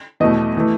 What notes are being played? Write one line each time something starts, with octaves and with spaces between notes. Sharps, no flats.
E2 B2 A3 D#5
E3 A3